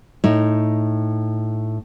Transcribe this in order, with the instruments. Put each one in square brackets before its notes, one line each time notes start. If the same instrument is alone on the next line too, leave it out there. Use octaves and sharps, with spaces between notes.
[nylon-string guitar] A2 D#4